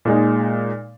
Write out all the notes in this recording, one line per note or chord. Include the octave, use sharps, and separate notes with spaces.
A#2 G#3 D#4